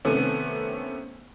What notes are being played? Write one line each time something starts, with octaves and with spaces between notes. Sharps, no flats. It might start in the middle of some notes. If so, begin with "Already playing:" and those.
C3 D#3 A3 B3 C#4